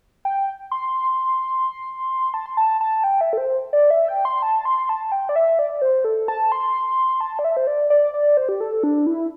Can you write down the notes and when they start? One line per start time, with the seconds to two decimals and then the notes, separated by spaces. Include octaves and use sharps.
0.25 G5
0.71 C6
2.34 A5
2.46 C6
2.57 A5
2.81 A5
3.04 G5
3.21 E5
3.33 A4
3.38 C5
3.73 D5
3.90 E5
4.08 G5
4.25 C6
4.42 A5
4.65 C6
4.89 A5
5.12 G5
5.29 D5
5.36 E5
5.59 D5
5.82 C5
6.05 A4
6.28 A5
6.52 C6
7.21 A5
7.39 D5
7.44 E5
7.57 C5
7.67 D5
7.90 D5
8.14 D5
8.37 C5
8.49 G4
8.60 A4
8.83 D4
9.07 E4